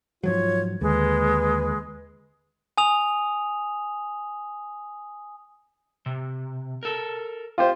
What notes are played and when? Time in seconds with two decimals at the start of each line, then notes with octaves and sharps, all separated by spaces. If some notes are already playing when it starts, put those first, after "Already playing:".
0.24 G#2 F3 F#3 F4 C#5
0.81 D#2 D3 G#3 B4
2.78 G#5 D#6 F7
6.06 C3
6.83 A4 A#4
7.58 F4 G4 C5